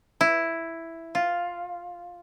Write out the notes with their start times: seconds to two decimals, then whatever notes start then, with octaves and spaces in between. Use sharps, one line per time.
0.21 E4
1.15 F4